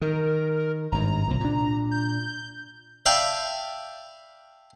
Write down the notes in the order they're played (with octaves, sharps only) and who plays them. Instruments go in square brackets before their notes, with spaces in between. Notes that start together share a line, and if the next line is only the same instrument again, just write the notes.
[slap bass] D#3 [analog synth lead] A#4
[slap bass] G#1 G2 [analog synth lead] A#5
[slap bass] C2 A#2
A#2 D4
[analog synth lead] G6
[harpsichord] D5 E5 F5 G5 A5 B5